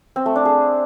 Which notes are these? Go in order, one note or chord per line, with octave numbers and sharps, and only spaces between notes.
C4
A3
D4
G#4